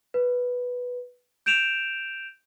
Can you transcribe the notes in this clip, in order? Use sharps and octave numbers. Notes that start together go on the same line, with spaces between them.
B4
G6 D7 E7 F7